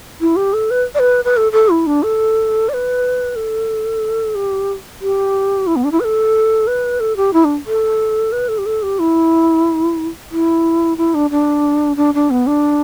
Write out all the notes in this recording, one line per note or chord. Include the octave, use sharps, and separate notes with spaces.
E4
G4
A4
B4
D5
B4
B4
A4
A4
E4
D4
A4
D5
B4
A4
G4
G4
E4
B3
D4
E4
B4
A4
B4
A4
G4
E4
D4
A4
B4
A4
G4
A4
G4
E4
E4
E4
D4
D4
D4
D4
B3
D4